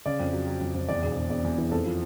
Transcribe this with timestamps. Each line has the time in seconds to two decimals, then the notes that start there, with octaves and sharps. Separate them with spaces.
0.06 C#3 D5
0.20 F2
0.33 F#3
0.47 F#3
0.61 F2
0.75 F2
0.88 E2 D5
1.02 E1
1.16 E1
1.30 E1 D5
1.44 E2
1.58 E3
1.71 F2 A4
1.86 F3